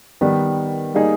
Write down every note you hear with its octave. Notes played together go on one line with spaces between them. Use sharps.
D#3 G3 B3
G3 A#3 D#4 G#4